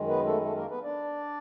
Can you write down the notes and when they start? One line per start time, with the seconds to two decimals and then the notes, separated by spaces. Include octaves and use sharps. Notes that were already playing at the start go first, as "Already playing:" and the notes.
Already playing: F#2 D#3 G#3
0.09 B3 B4
0.26 A3 A4
0.44 A3 A4
0.57 A#3 A#4
0.70 B3 B4
0.83 D4 D5